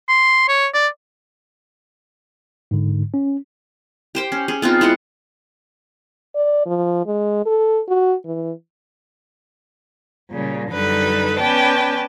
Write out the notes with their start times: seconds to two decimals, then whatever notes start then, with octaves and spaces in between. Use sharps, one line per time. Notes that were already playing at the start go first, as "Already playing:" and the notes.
0.09 C6
0.48 C#5
0.74 D5
2.71 G#2 D3
3.14 C#4
4.15 G4 C5 G5
4.32 C#4
4.48 C#4 G#4
4.62 B3 C4 D#4 F4
4.81 G#3 E4 F4 F#5
6.36 D5
6.66 F3
7.07 G#3
7.46 A4
7.89 F#4
8.25 E3
10.31 A#2 C#3 G3
10.70 F#2 D3 G3 D#4 A4 B4
11.38 B3 C#4 B4 D5 G5 A5